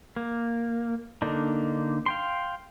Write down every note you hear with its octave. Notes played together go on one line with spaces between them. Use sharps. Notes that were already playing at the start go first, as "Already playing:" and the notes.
A#3
D3 A#3 D4 D#4
F5 G5 C6